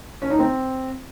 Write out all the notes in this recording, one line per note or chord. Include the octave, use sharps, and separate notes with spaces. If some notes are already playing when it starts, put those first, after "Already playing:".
C#4
D#4
C4